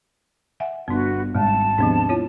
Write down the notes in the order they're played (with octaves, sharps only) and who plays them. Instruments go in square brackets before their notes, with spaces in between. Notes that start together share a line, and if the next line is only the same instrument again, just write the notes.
[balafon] E5 F#5 G#5
[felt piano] G1 [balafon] B3 D4 [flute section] F#4 B4
[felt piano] G#1 [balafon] G3 G#3 [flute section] A5
[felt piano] D#2 G#2 C3 [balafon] F3 B3 D4
[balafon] E4 F4 C#5